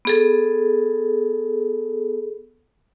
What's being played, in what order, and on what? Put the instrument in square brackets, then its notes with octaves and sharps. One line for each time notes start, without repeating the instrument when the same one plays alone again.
[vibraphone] B3 G#4 A4